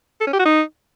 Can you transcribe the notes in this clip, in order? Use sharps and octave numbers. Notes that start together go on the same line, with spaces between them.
A4
C#4
G4
F#4
D#4